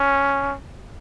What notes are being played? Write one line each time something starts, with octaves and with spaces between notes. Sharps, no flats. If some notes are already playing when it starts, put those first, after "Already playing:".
Already playing: C#4